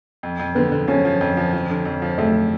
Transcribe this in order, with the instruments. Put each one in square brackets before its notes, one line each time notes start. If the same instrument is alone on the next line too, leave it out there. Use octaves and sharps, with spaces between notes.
[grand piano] F2
F2
[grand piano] D3 [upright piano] B3
[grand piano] D3
[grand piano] F3 [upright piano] C#4
[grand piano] F3
F2
F3
F3
D3
F2
F3
[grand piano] F2 [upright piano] A3